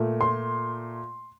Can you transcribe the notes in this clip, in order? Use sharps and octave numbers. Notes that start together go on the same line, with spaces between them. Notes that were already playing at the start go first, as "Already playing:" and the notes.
Already playing: A#2 A3
C6